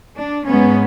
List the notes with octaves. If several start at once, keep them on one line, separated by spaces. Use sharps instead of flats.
D4
G#2 G#3 B3 C#4